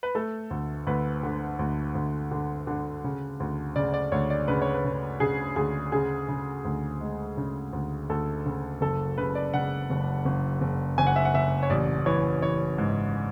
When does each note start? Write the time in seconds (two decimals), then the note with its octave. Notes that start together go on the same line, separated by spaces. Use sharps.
0.03 B4
0.15 A3 A4
0.51 D2
0.87 D2 B4
1.23 D3
1.59 D2
1.95 D2
2.31 D3
2.67 D3
3.04 C#3
3.40 D2
3.76 C#3 D5
3.94 D5
4.12 D2 C#5
4.30 D5
4.48 C#3 B4
4.62 C#5
4.74 B4
4.84 C#3
5.20 C#3 G#4
5.56 D2 G#4
5.92 C#3 G#4
6.28 C#3
6.65 D2
7.01 G#3
7.37 C#3
7.73 D2
8.09 D2 A4
8.46 C#3
8.81 F#1 A4
9.18 C#3 B4
9.35 D5
9.54 C#3 F#5
9.90 F#1
10.25 F#1
10.61 F#1
10.98 F#1 G#5
11.07 F#5
11.16 E5
11.25 F#5
11.34 F#1 E5
11.63 C#5
11.70 A1 D5
12.06 E3 C#5
12.42 E3 C#5
12.78 G#2